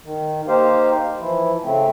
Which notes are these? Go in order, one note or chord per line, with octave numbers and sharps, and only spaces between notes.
D#3
A#3 D#4 G4 C5 F5
E3 F3 E4
C#3 A3 C4